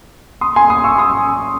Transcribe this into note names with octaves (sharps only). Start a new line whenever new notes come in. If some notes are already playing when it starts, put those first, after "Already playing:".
C6 D#6
G#5 C6
C6 D#6
C#6 E6
C6 D#6